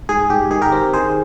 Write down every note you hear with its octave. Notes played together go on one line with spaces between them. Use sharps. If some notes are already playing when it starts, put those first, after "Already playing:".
G#2 G#4
G#2 G4
D#3 G#4
G4 A#4
C4
D#3 G#4 C5